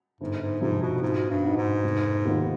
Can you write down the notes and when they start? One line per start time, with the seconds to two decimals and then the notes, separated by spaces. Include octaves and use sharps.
0.21 G1 G#2
0.41 G#2
0.61 F2 G#2 C3 F3
0.82 B2
1.02 G#2 B2
1.30 G2
1.43 B3 D#4
1.57 G#2
1.84 F1
2.25 D#2 D#3 B3 F4